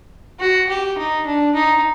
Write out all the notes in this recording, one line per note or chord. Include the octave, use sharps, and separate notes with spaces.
F#4
G4
D#4
D4
D#4